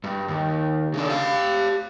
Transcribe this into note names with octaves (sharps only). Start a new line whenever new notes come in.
G2
D#2
C#3 D4
G4 F5